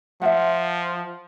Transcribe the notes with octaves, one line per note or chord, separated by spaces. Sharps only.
F3 E5 F#5